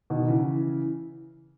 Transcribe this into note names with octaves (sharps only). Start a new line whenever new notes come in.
B2 D#3
C#3 E3